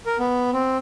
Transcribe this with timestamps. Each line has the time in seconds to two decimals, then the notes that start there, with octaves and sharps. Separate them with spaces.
0.06 A#4
0.19 B3
0.53 C4